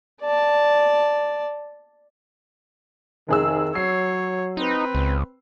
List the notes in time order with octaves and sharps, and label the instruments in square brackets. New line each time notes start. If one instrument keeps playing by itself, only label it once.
[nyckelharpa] D5 A5
[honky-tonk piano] F1 G#4 E6 [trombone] D#3
[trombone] F#3 [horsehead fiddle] C#5 [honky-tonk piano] C7
[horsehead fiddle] C4 B4 [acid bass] D#4
[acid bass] C#2